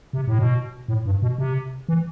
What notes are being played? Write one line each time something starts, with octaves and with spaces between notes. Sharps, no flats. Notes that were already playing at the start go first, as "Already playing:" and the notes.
C3
A2
B2
A2
G2
B2
C3
E3